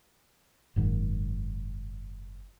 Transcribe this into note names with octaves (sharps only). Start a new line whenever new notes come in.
F#1 G#2 D#3